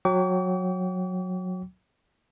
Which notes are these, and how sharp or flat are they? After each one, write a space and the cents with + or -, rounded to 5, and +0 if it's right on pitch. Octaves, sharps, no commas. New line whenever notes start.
F#3 -15 G5 -15 D6 -45